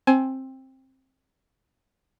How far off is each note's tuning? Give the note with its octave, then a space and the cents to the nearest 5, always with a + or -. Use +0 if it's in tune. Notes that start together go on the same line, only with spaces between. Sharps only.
C4 +15 G#5 +25